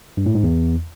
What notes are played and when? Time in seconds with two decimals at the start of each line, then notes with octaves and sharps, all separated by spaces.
0.17 G2
0.26 A2
0.35 G#2
0.43 E2